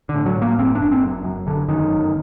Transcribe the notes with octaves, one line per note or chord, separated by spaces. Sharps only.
D3
A2
F#3
A2
A#3
F#1 C4
D4
F#1
C4
F#2
F#2
F#1 D3
F#2 D#3
G1